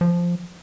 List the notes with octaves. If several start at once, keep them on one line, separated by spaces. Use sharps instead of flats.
F3